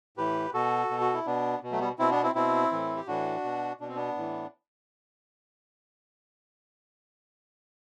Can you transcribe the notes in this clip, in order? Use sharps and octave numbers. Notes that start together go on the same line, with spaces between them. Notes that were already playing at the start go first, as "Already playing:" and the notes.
A2 E3 G4 B4
B2 F#4 A4
B2
F#4
E4
B2 B3 D4
B2
F#3 A3
G3 B3
B2 C4 E4
B3 D4
C4 E4
B2 C4 E4
A2 E3
G4
A2 E3 D4 F#4
B2
B2 D4
C4
B3 D4
A2 E3